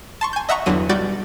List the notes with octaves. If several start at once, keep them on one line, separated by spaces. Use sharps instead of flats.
A5 C6 C#6
G#5 G6
D#5 E5 F#5 A#5 C#6
G1 E2 D3 F#3 D#7
B1 G3 F#4 D5 G6 A6